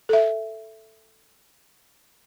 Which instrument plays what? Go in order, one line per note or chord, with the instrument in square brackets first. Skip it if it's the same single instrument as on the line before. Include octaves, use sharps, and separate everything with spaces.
[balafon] A4 E5